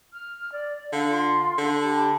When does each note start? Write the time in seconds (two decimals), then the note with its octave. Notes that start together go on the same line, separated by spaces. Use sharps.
0.11 F6
0.51 D5
0.92 D3 F5
1.09 F4 C6
1.58 D3
1.80 G4 A5 B5